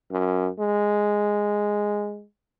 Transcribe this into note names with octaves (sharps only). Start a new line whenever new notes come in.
F#2
G#3